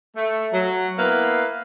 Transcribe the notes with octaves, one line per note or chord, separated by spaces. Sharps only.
A3
F#3
A#3 B3 E4 B4 F5